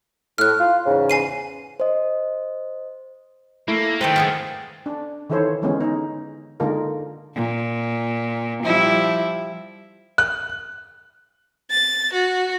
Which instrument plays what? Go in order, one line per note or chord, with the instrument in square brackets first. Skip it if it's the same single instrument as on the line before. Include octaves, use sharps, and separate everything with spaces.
[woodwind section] A2 [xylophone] F6 F#6
[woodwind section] F4
E2 G#2 C#3
[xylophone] G#5 C7 D#7
[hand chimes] C5 D#5
[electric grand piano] A3 E4 [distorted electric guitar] A#3
[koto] D#3 A4 B4 [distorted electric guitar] G#3 A3 [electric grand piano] C5 [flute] G5
[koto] A#3 B3 G#4
[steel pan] D4
D#3 E3 E4 A4 C5 C#5
D3 E3 G#3 B3 C#4
D#4
D3 G#3 A#3 D#4 F4 A#4
[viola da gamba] A#2
F3 G3 E4
[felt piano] F#6
[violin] A6
F#4